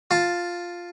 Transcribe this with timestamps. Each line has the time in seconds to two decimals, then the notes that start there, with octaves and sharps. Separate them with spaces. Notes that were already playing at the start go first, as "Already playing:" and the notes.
0.11 F4 A5